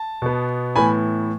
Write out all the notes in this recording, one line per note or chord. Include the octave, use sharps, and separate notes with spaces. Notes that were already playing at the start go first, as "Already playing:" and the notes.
Already playing: A5
B2 B3
A2 E3 B3 G#5 B5